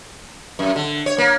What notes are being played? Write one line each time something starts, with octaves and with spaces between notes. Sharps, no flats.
F#2
D3
C#5
A#3